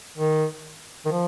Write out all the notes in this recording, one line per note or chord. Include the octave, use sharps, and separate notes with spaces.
D#3
D#3
F3